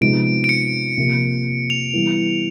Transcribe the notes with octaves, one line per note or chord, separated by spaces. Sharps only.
C3 F3 G#3 B3 D#4 D7
D7
C#7
C3 F3 A#3
F7
E3 G3 B3